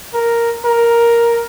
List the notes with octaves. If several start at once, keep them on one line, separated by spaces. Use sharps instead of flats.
A#4
A#4